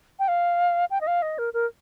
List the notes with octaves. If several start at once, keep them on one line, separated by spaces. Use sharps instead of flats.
G5
F5
G5
D#5
F5
D#5
A#4
A#4